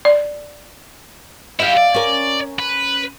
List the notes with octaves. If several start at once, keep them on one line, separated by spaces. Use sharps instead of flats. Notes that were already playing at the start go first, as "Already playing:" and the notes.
D5
E4 G4 E5 F5
D5
C#4 A#4
B4